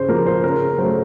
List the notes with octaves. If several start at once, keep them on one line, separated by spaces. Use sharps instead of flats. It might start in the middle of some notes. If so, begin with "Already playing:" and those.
Already playing: C#3 C5
F3 A#3 A#4
C5
C#3 A#4
F#3 A3 C5